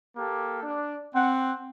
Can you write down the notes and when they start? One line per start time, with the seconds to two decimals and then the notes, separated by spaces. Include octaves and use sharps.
0.17 A#3 G4 A4
0.63 D4
1.15 C4 F#5